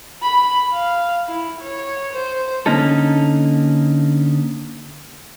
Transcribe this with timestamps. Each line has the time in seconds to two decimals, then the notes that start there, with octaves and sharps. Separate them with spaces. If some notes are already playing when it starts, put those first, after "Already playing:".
0.22 B5
0.73 F5
1.28 E4
1.61 C#5
2.13 C5
2.66 D3 A#3 C#4 D#4 A4